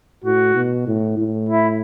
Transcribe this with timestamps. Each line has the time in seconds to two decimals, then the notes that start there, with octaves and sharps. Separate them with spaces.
0.24 A2 F#4
0.55 B2
0.87 A2
1.18 A2
1.49 E4